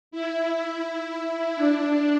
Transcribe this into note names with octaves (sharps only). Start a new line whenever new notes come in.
E4
E4
D4